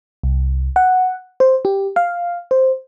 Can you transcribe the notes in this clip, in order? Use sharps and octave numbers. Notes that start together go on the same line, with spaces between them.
C2
F#5
C5
G4
F5
C5